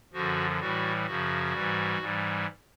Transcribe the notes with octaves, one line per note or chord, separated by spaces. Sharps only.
F#2 D3 F3 F#4
A2 E3 G3 F#4
F#2 C#3 F3 F#4
G#2 E3 G3
G#2 E3 G3